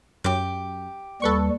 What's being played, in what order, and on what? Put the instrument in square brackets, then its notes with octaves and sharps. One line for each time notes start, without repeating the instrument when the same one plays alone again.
[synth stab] F#2 [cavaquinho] G4 D6
[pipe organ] D#2 G3 [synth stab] A4 B4 C#6